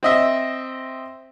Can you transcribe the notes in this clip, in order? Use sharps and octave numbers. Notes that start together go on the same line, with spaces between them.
C4 D#5 E5